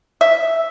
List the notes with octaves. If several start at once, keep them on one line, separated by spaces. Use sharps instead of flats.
E5